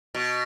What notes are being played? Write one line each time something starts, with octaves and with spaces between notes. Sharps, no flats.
B2